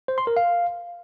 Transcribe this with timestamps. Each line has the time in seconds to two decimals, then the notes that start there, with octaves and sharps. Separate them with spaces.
0.08 C5
0.18 C6
0.27 A#4
0.37 F5